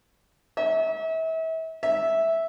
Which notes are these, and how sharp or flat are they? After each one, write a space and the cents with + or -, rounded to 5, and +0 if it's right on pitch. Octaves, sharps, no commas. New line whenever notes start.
E5 -35
E5 -5